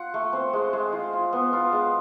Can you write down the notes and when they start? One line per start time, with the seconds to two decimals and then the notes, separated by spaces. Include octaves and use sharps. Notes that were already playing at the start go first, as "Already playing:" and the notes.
Already playing: F4 F#5
0.14 A3
0.33 C4
0.53 G#3
0.73 G#3
0.93 F4
1.13 F4
1.33 B3
1.53 F4
1.72 G#3